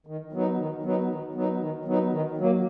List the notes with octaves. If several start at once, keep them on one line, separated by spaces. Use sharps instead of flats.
D#3
F#3 B3 D#4
D#3
F#3 B3 D#4
D#3
F#3 B3 D#4
D#3
F#3 B3 D#4
D#3
F#3 A#3